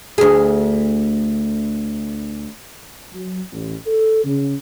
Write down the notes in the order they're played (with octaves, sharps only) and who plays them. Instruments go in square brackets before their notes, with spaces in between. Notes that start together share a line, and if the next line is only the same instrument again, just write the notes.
[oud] D2 G#4
[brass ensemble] F#3
A1
A4
C#3